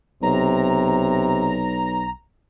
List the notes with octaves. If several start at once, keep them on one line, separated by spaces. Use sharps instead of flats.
B1 C3 A#5